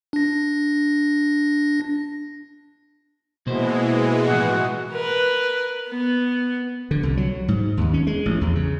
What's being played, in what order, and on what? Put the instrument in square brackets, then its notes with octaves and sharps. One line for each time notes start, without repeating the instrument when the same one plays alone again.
[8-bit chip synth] D4 A#6
[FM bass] B2 [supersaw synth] E3 G#3 [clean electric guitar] A#3 C5
[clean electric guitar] A2 F3 [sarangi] F#4
[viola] A#4 B4
B3
[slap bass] D3
C2
F#3
G#2
D#2
C#4
G#3
A1
E2
C#3